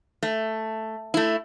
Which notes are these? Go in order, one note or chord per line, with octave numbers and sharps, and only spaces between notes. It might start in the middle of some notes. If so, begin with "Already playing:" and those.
A3
A3 E4